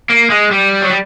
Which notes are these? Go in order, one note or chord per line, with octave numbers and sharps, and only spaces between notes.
A#3
G#3
G3
F#3
G3